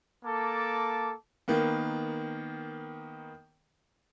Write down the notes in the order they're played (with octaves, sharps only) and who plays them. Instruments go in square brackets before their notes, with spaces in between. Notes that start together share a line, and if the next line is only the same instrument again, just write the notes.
[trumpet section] A#3 A4 A5 D6
[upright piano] D#3 A#3 B3